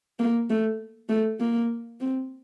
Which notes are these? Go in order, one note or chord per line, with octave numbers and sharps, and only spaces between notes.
A#3
A3
A3
A#3
C4